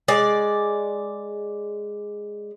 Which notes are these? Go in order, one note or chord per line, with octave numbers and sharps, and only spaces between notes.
G#3 D5